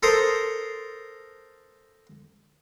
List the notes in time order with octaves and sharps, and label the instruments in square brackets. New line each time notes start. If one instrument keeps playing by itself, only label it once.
[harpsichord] A4 A#4 C5 D#6